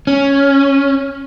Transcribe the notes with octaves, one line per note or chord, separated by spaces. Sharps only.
C#4